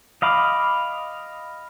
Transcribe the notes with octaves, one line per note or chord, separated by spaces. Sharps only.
D#5 F5 B5 D6